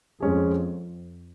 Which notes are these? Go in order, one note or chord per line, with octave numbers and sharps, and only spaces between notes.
F2 G#3 C#4 G#4